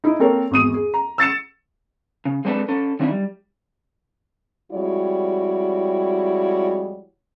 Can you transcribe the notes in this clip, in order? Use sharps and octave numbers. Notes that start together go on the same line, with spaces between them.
D#4 E4
A#3 C4 A4 A#4 C#5
G#1 E2 D#6 D#7
G#4
A#5
E6 A6 C#7 E7
C#3
G#3 C4 D4 A4 B4
C#4 A4
D#3 C4 D4 E4
G3
F2 G3 G#3 E4 F#4 C#5